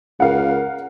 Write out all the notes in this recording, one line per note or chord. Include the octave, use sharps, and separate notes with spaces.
C#2 A#4 F5 F#5